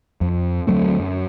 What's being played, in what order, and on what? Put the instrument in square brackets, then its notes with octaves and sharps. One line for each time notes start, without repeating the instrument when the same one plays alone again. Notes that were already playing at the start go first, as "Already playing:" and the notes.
[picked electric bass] F2
D2 F#3 A3 C4
F#2